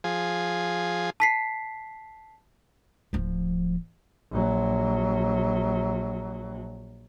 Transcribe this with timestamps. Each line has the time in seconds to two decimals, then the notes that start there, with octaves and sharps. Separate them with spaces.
0.04 F3 G#4
1.20 A5 B6 C7
3.13 D1 F3
4.31 A#1 F#3